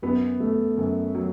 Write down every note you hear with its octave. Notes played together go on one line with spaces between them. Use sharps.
F#2 B3 B4
A3
F#2
F#3